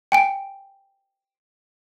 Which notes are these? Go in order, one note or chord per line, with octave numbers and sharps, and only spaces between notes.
G5 G#5 D7